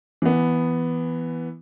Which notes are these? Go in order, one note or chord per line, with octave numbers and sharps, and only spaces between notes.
E3 B3